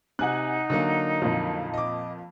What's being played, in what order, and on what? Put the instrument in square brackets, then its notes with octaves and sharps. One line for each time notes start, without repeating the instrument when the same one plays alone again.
[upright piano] C3 [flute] D#4 [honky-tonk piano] F#5 G#5 F#6
[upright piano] D3 F#3 A#3
[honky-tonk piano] F2 A#2 F3
[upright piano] D#5 D6